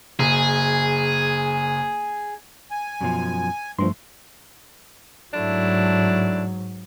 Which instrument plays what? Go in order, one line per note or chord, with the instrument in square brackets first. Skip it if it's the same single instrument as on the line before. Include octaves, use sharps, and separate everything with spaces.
[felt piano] F#1 [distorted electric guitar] G#4
[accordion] G#5
[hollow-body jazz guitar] F#2 B2 F3
[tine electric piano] G2 F3 [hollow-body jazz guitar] A3 C6
[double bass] G#2 F#3 [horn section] A3 D4 E4